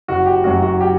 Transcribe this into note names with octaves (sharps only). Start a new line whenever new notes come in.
F#1 F#4
G4
F#2 F#3 F#4
F#4
G4